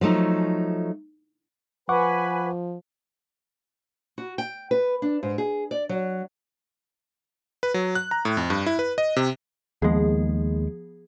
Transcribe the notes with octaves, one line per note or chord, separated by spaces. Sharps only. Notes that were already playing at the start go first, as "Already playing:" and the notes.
F3 F#3 A3 D#4
F3 B4 F#5 G#5 B5 C#6 D6
F#4
G5
B4
D4
G#2
G#4
D5
F#3
B4
F#3
F#6
A#5
A2
F2
G2
E4
B4
D#5
C3
D#2 F3 G#3 B3 G#4